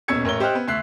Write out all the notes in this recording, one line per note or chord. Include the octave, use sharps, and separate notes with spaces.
D#1 B2 C#4 E6 G#6 C#7
A1 A#4 C#5 G7
G4 C5 D#5 G5 F6 F#6
B3
D2 E5 F#6 C7